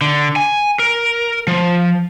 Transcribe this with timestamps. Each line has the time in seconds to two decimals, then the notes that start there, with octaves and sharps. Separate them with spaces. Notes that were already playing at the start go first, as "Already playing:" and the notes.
0.01 D3
0.36 G#5
0.79 A#4
1.47 F3